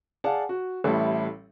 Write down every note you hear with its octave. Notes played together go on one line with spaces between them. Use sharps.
G#4 D5 F5 F#5 A5
F#4
A1 A2 G3 E4 A4